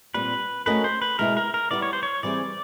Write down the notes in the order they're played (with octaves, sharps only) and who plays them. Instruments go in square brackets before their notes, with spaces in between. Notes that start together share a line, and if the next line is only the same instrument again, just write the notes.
[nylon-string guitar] A#2 G3 C4 [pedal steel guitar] B4
[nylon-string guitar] A3 C#4 F#4 A#4 D#5 [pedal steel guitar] B4
[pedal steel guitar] C5
B4
[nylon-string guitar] B2 G#3 B3 E4 G#4 [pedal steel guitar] A#4
[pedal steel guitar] A#4
A#4
[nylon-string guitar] G3 B3 E4 [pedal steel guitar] D5
[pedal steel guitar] C#5
C5
C#5
[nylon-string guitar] E3 G3 C4 E4 G#4 [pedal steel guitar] D5